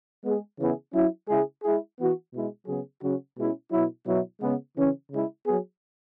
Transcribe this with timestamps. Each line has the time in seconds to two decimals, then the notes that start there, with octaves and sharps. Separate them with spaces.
0.25 G#3 B3 G#4
0.59 C#3 E3 B3 E4 G#4
0.94 F#3 C#4 E4
1.29 C#3 G#3 E4 G#4
1.63 G#3 E4 G#4
1.99 E3 B3 F#4
2.33 B2 G#3 E4
2.67 C#3 F#3 B3 G#4
3.02 C#3 F#3 C#4 F#4
3.37 B2 G#3 C#4 E4
3.72 B2 F#3 E4
4.07 B2 F#3 E4
4.42 C#3 G#3 B3
4.77 C#3 E3 C#4
5.11 C#3 G#3 E4
5.46 F#3 B3 G#4